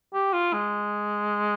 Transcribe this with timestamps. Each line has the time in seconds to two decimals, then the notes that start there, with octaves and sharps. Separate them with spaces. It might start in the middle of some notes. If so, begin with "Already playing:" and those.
0.14 G4
0.33 F4
0.53 G#3